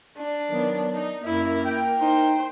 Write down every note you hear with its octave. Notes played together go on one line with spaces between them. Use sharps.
D4
D#3 F#3 B3
D#4
F#2 A#3 E4 A#4
G5
D#4 C5